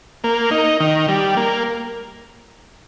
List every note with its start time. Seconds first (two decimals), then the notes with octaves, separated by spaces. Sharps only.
0.24 A#3
0.51 D#4
0.80 D#3
1.08 G3
1.37 A#3